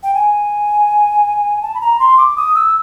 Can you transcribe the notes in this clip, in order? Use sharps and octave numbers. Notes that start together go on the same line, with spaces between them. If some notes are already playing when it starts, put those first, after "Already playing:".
G5
G#5
A5
B5
A#5
C6
D6
D#6
E6